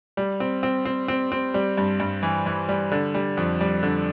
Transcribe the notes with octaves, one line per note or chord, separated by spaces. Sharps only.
G3
C4
C4
C4
C4
C4
G3
G2
G2
E3
E3
G3
D3
G3
F2
G3
D3